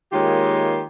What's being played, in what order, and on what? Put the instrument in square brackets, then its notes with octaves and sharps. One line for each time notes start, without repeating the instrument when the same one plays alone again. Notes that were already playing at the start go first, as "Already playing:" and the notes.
[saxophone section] D#3 G#3 A#3 F4 G4 C#5